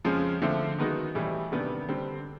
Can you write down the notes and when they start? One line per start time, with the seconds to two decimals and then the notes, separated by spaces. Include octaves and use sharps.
0.05 F2 C#3 F3 G#3 C#4
0.42 D3 F3 A3 C4
0.79 D#3 G#3 B3 D#4 F#4
1.15 A2 E3 G3
1.52 C3 D#3 G3 B3 D4
1.88 D3 G3 C4